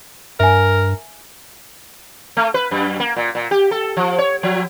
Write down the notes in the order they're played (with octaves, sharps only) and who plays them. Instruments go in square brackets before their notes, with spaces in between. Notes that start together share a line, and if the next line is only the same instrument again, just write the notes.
[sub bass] G2 [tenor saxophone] A#4 [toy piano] E5 G#5
[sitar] A3
B4
F#2
A#3
A#2
A#2
G4
A4
F3
C#5
F3